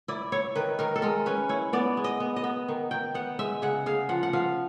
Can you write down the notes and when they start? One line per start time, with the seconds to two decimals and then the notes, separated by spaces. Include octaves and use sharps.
0.08 E4 D5
0.32 E4 C#5
0.56 D#3 B4
0.79 D#3 A#4
0.96 A4
1.02 G#3 A#4
1.26 C#4 B4
1.49 E4 C#5
1.73 B3 D5
1.97 G#3
2.04 D#5
2.20 B3
2.36 D#5
2.44 B3
2.68 D#3
2.91 D#3 G5
3.14 B3 F#5
3.39 G#3 E5
3.62 C#3 F#5
3.86 C#3 F5
4.09 F3 F#5
4.23 F#5
4.33 F3 F5